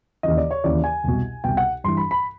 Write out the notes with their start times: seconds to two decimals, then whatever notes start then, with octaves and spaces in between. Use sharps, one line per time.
0.23 D#2 C#3 E3 D#5
0.37 D5
0.51 C#5
0.64 D#2 C#3 E3 D5
0.84 G#5
1.04 C2 B2
1.44 C2 B2 G5
1.57 F#5
1.84 G2 E3 C6
1.97 B5
2.11 B5